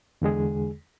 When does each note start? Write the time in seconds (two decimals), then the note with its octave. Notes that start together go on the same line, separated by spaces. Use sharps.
0.22 E2 D3 G#3 G#4